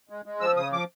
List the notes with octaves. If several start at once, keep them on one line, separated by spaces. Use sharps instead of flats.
G#3
G#3
F3 E6
C#3 D#6
F3 D6